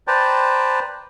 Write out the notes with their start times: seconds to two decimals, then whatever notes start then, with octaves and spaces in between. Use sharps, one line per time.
0.08 B4 C5 D5 G5 A5 A#5